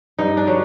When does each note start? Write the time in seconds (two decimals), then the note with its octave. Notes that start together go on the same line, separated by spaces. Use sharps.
0.18 G2 D#4
0.37 D4
0.47 D3 F#3